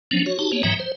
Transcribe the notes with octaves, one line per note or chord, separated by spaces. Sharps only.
F3 F#3 B3 C#4 D4
F#4 C#5
D#4 F#4 G4 A5
A#3 B3 C#5
G#2 E3 F#3 E5 G5 A#5
C5